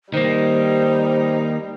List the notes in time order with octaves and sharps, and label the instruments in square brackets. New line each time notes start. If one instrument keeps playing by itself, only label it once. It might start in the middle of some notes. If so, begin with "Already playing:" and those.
[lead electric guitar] D#3 A#3 [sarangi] G3 [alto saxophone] D#4 [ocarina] C5